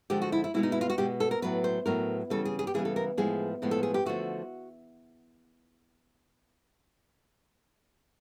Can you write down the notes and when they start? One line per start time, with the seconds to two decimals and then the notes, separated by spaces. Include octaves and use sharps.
0.10 D3 F3 G#3 G4
0.22 F#4
0.32 E4
0.44 E4
0.54 B2 G#3 B3 E4
0.63 D#4
0.72 E4
0.81 F4
0.90 F#4
0.98 B2 G#3 B3 G4
1.20 A4
1.31 A#4
1.42 A2 F#3 B3 B4
1.64 C5
1.86 A2 F#3 B3 A#4
2.30 C#3 E3 G3 B3 A4
2.45 G#4
2.59 G#4
2.67 G4
2.74 C#3 E3 G3 B3 G#4
2.85 A4
2.96 A#4
3.17 A2 F3 G#3 B3 G#4
3.62 A2 F3 G#3 B3
3.71 A4
3.83 G#4
3.94 G4
4.06 D3 F3 A3 F#4